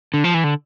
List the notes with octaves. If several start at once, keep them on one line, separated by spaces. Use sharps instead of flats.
D3
F3
E3
D3